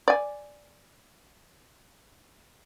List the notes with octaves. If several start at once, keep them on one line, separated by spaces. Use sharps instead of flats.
D5 G#5